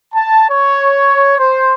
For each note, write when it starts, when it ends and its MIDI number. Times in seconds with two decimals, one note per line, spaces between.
0.14 0.46 81
0.49 1.34 73
1.39 1.73 72